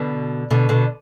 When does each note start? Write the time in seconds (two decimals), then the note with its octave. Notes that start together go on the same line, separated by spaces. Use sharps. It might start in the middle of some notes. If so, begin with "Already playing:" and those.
Already playing: B2 D3
0.51 B2 D3
0.69 B2 D3